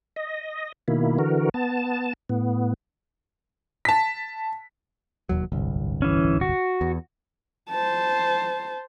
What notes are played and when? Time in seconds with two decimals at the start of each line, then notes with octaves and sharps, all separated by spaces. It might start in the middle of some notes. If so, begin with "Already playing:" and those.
0.16 D#5
0.88 B2 D#3 A#3 E4
1.19 D3 E3 F#4 A#4
1.54 B3 A5
2.29 A2 B3
3.85 A5 B6
5.29 E1 D#2 F#3
5.52 D1 G1 C2
6.02 E3 C#4
6.41 F#4
6.81 E2
7.69 C5 A5